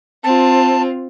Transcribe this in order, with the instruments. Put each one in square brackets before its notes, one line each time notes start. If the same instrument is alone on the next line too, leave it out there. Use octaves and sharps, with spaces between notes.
[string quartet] C4 F4 [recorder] A5